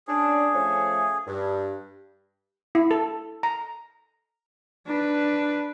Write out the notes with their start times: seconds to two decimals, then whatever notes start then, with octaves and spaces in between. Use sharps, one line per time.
0.07 C#4 D4 G#4
0.54 F3 A3 C#4
1.26 G2
2.75 E4
2.91 A4
3.43 A#5
4.87 D4 B4